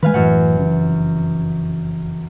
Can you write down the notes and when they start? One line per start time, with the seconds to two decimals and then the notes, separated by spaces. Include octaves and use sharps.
0.03 D#3 G#3 B4 F5 G#5
0.14 F#2 A2 E3 F#5
0.57 F1 C#3 E3